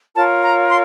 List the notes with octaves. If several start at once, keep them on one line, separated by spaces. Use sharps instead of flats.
F4 A#4 C#5 A5
A#5
C6